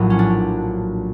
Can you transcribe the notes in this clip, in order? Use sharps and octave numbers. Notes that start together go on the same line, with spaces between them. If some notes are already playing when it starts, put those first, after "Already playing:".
Already playing: A#1 A2 F#3
C#4
D4